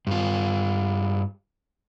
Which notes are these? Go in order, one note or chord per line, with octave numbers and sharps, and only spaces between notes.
G2 F4